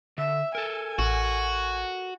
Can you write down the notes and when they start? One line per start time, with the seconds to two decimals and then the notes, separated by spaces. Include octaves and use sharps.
0.18 D3 E5
0.55 A4 A#4 G#5
0.99 A1 F#4